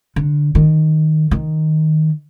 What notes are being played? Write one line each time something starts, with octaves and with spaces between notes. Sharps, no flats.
D3
D#3
D#3